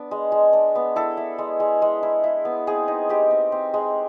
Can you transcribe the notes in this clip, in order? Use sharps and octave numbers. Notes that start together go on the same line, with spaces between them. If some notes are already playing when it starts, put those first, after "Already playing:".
Already playing: B3 D4
G#3
G#3
D4
B3
E4 A4
E4
G#3
G#3
G#3
E4
E4
B3
C4 G#4
D#4
G#3 G4
C4
C4
G#3